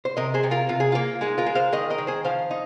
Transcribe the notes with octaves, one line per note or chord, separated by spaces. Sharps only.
C5
C3 A#4 D#5
G#4 C5
C3
F4 A#4
C3 F4
G#4
A#3 F4
G#3 D#4 G#4
F4 A#4
G#3
C5 F5
D#3 A#4 D#5
A#4 D#5
D#3
G#4 C5
F3 C5 F5
D#4